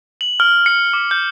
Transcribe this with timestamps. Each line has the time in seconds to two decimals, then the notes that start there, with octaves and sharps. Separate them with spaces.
0.21 F#7
0.40 F6
0.66 C#7
0.93 D6
1.11 G6